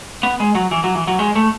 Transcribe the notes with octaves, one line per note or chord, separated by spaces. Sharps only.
B3
G#3
F#3
E3
F#3
E3
F#3
G#3
A3